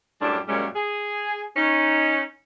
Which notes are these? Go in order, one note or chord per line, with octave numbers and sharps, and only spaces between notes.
F#2 A2 G3 D4
F#2 A#2 G3 G#3 C#4
G#4
C#4 D#4